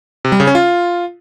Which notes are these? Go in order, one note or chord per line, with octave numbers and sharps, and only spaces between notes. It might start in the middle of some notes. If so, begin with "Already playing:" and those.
C3
G3
C#3
C#4
F4